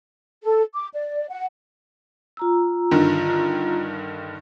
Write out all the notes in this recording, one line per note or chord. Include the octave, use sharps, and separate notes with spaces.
A4
D6
D5
F#5
F4 A#5 E6
G2 D3 D#3